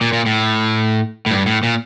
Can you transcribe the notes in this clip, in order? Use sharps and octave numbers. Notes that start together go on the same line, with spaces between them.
A#2
A#2
A2
A2
G2
A2
A#2